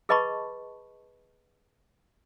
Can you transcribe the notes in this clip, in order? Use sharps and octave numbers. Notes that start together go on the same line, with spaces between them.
G#4 B4 D#5 A5 B5 C#6